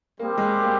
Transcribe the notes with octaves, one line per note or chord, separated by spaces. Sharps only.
G3 A#3 C4 G4
G#3
A#3